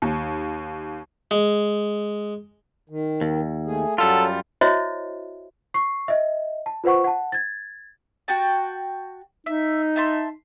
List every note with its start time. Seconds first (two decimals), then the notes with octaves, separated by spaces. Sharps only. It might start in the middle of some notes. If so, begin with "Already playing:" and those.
0.02 D#2
1.31 G#3
2.90 D#3
3.21 D#2
3.66 A3 G#4
3.98 F#2 F#3 G3 F4 A4
4.61 E4 F#4 C5 C#5 D#5 E5
5.74 C#6 C7
6.08 D#5 E5
6.66 A5
6.84 F4 B4 C5 F#5 C#6
7.04 F#5 A5
7.32 G#6 A6
8.28 F#4 G5 A5
9.46 D#4 E5
9.96 E5 A5 C6